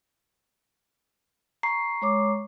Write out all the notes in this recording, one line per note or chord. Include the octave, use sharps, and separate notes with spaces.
A#5 C#6 C7
G#3 C#5 D6